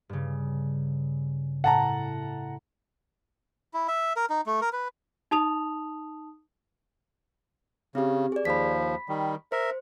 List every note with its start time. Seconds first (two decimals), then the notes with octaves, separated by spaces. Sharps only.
0.09 G2 C#3
1.64 A2 F#5 A5 A#5
3.74 E4
3.88 E5
4.16 A#4
4.30 D#4
4.46 A3
4.62 A#4
4.73 B4
5.31 D#4 A5 D#6 F7
7.95 C#3 C4 G4
8.32 G#4 D5
8.45 D#2 F3 B5 B6
9.09 D#3 G3
9.52 A#4 C5 E5